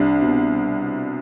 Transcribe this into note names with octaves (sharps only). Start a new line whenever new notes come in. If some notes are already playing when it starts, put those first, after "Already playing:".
Already playing: C2 D4
B2